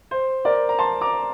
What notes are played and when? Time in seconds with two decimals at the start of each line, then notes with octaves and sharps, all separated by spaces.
0.11 C5
0.45 A#4 D5
0.69 A#5
0.79 A5 C6
1.01 A#5 D6